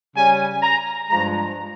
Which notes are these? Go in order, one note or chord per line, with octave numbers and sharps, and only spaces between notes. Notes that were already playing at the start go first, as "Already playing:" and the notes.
C#3 G3 C#4 G#5
A#5
G2 F3 G#3 A#5